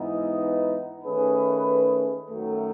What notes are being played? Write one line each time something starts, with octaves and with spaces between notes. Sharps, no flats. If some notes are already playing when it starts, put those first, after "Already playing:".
Already playing: G#2 E3 B3 D#4
D#3 A3 C#4 G#4 B4
F#2 D#3 F#3 A3